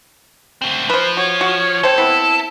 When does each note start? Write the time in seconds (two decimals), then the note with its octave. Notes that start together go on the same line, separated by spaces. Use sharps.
0.62 D2 C4
0.90 F3 B4 C5
1.17 F#4 C#5
1.41 F#4
1.83 A4 C5 G5
1.97 B3 C4 E4